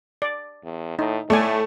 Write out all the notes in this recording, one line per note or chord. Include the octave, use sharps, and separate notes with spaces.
D5
E2
A2 D#4
A2 A3 A4 D5 G#5